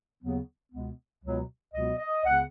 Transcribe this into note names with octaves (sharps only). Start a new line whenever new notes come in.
D#2 C#3 F#3 B3
C#2 B2 G#3 B3
C#2 B2 F#3 B3
C#2 B2 F#3 B3 D#5
D#5
C#2 C#3 B3 F#5